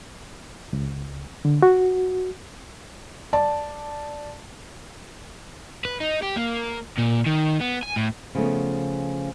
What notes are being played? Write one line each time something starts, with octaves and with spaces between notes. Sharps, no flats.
C#2
D3
F#4
D5 A5
B4
D#4
G4
A#3
A#2
D#3
B3
G#5
A2
C#3 F3 A3 B3